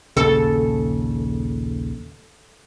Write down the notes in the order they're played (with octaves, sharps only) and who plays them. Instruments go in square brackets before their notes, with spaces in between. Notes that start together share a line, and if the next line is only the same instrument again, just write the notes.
[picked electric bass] A#1 D#2 C#3 [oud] A4